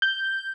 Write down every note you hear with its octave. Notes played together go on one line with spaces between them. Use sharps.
G6